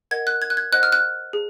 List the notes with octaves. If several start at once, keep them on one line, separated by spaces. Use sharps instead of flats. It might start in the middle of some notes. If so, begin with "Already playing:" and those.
A#4 D#5 F#5 G#6
F#6
G#6
F#6
G#6
C5 D#5 F#5 F#6
F6
F#6
G#4